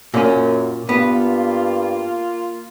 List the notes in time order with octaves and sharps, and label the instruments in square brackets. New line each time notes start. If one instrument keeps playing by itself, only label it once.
[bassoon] F#2 [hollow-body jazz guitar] A#2 C#4
[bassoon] G2 [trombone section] A#3 F4 [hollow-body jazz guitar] B3